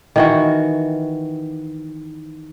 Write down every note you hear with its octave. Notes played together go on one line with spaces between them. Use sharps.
D#3 E3 F#4